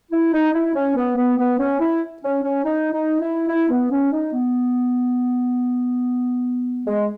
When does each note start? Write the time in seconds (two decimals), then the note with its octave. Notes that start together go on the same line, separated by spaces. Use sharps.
0.12 E4
0.33 D#4
0.54 E4
0.75 C#4
0.96 B3
1.17 B3
1.38 B3
1.59 C#4
1.80 E4
2.22 C#4
2.43 C#4
2.64 D#4
2.92 D#4
3.21 E4
3.48 E4
3.70 B3
3.91 C#4
4.12 D#4
4.33 B3
6.85 G#3